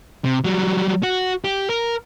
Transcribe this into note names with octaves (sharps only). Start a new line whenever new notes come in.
C3
F#3 G3
F#4
G4
A#4